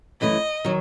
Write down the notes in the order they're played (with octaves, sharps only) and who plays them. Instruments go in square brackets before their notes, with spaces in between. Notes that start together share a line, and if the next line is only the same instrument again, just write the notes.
[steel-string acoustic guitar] F#2 E3 A3 E4 [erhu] D#5
[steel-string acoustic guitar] D#3 F#3